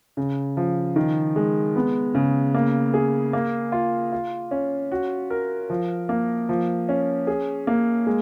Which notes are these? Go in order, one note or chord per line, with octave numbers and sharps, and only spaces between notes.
C#3
F3
D#3
G#3
B3
C#3
A#3
G#4
A#3
F4
F4
C#4
F#4
A#4
F3
A#3
F3
C#4
G#4
A#3
G#3